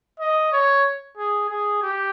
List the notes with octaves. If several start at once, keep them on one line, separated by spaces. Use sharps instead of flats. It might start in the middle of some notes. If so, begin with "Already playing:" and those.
D#5
C#5
G#4
G#4
G4